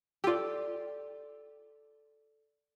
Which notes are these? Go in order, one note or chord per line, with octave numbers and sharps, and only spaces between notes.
F4 G4 A4 D5